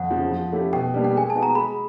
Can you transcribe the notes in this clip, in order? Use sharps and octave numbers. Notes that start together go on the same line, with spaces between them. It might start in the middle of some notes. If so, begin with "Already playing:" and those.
Already playing: F2 F#5
C#3 F3
F3
A3 C#4 E4 G4
B2 G5
G3 A#3 D4 G4
G5
G#3 G#5
A5
B3 D#4 F#4
A#5
G#3 B5